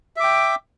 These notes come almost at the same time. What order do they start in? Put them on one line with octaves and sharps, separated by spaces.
E5 D6 G5